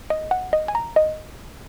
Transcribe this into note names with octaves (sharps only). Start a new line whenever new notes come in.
D#5
F#5
D#5
G#5
A#5
D#5